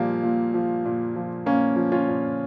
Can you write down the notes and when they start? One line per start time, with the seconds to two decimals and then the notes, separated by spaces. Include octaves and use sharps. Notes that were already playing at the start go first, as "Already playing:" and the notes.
Already playing: A#2 F3 G3 A#3
0.23 A#2
0.54 F3
0.85 A#2
1.16 F3
1.46 A#2 A#3 C#4
1.76 F3
1.92 C#4 F4
2.08 A#2